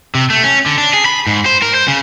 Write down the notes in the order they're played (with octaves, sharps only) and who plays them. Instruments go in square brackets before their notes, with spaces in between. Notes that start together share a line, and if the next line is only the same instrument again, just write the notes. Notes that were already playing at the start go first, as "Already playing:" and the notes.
[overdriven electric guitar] C3
A3
C#4
D3
D4
G#4
B5
G#2
C5
A#4
C5
C#3